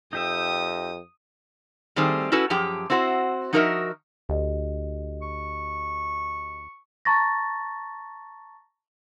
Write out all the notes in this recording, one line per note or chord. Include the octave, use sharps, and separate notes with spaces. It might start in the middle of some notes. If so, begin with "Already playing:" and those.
F2 D#4 G4 E5 D#6
D#3 G3 A3 C4 G#4
C#4 E4 F#4 A4 B4
F#2 F3 G4 G#4 G5
C4 E4 F#4 A#4 C5
F3 D#4 F#4 A#4 D#5 E5
D2 G4 D#5
C#6
A5 A#5 C#6 A6 A#6